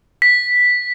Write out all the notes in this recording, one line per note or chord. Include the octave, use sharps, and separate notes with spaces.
B6